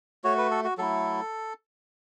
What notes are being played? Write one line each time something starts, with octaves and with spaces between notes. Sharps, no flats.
A3 F#4 C#5
B4
A4
F#4
F#3 A3 E4 A4